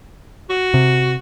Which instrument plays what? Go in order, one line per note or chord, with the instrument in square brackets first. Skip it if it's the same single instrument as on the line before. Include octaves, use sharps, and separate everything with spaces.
[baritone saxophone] F#4
[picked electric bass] C3